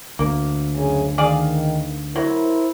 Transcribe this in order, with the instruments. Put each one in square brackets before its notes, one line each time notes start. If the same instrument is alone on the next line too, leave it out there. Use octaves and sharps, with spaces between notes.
[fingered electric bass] D2 [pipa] A#3
[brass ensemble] F#2 C#3 G#5
[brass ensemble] D#3 [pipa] G#4 D5 F5
[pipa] F#3 [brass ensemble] E4 A#4 C5